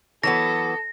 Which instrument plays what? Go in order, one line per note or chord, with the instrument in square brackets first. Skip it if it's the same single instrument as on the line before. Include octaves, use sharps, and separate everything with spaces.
[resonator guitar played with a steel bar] E3 F#3 B3 [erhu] A4 [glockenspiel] A#6